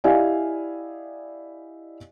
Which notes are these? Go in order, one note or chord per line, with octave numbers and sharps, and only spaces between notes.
E4 G4 D5 D#5 F5 G#5